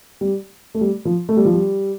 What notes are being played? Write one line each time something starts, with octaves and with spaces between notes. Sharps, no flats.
G3
A3
G3
F3
A3
G3
F3
G3